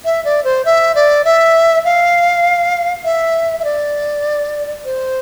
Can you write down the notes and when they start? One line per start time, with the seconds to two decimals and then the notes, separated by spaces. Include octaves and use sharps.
0.05 E5
0.25 D5
0.44 C5
0.65 E5
0.95 D5
1.25 E5
1.85 F5
3.04 E5
3.60 E5
3.64 D5
4.85 C5